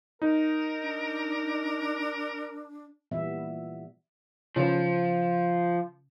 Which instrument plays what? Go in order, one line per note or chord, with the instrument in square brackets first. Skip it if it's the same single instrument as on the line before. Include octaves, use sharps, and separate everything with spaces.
[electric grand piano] D#4 [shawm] A#4
[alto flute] D4
[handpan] A#2 E3 G3 B3 E5
[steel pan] C#3 B4 [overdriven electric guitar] F3